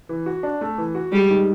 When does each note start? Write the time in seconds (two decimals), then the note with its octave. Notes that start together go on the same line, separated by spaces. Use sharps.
0.09 E3
0.26 F#4
0.43 D4
0.61 A3
0.78 E3
0.95 F#4
1.12 G3 G#3
1.30 D#3